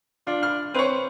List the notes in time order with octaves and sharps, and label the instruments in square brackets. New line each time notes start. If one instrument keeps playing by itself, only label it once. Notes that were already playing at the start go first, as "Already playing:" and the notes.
[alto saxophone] D4 [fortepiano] F4
[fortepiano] F6
[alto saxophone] C4 [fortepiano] B4 C#5